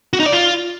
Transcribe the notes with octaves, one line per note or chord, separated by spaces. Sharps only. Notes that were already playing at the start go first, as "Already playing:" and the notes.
F#4
D#4
D5
F4